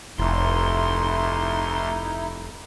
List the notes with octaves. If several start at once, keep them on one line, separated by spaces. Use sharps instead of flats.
F1 D2 D#4 E4 C6